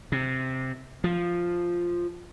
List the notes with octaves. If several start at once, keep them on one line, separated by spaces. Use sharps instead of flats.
C3
F3